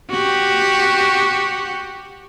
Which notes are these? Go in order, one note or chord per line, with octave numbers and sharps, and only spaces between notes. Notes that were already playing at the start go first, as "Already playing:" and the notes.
F#4 G4